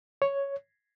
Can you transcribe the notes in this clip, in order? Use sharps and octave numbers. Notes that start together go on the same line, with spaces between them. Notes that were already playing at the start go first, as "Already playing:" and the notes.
C#5